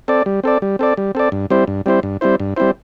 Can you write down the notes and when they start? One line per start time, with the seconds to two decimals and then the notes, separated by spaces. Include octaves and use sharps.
0.08 C4 A4 D5
0.26 G3
0.43 C4 A4 D5
0.62 G3
0.79 C4 A4 D5
0.97 G3
1.15 C4 A4 D5
1.32 G2
1.50 G3 C4 E4 C5
1.67 G2
1.86 G3 C4 E4 C5
2.03 G2
2.21 G3 C4 E4 C5
2.40 G2
2.56 G3 C4 E4 C5